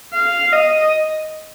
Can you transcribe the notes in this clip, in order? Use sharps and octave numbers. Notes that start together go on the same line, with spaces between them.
F5
D#5